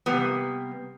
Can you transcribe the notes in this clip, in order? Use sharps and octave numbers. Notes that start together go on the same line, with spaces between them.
C3 G3 A#3 B3